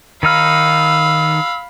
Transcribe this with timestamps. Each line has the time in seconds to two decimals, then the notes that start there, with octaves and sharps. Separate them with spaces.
0.23 D#3 D#4 F5 B5 E6 F6